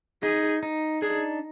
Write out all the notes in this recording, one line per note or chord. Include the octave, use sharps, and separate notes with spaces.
D#4 G#4
D#4
D4 G#4